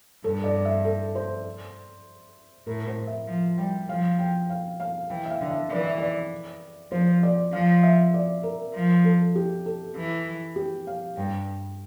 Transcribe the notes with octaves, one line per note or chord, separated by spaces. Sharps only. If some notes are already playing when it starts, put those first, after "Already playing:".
G2 A4
D5
E5
A4
C5
A2 A#4
C5
E5
F3
G3 G5
F3 F5
G5
F5
F5
E3 G5
E5
F5
D3
E5
E3 D5
E5
D5
F3 C5
D5
F3 F5
E5
D5
A#4
F3
A4
G4
A4
E3
G4
F5
G2 G5